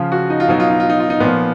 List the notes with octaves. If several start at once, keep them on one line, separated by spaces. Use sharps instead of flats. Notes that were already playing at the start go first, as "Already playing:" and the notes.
Already playing: C#3 F3 F4
F#4
D#4
F4
B2 F#3 D#4
F4
D#4
F4
D#4
F4
D#4
A#2 F3 B3